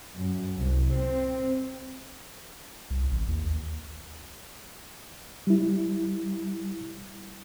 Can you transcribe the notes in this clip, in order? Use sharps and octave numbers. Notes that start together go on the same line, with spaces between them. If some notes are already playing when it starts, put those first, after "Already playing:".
F#2
C2
C4
C2
A1
D#2
G3 E4